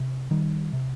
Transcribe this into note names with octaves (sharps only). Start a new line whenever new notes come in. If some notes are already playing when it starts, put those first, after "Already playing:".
Already playing: C3
D#3 G3
C3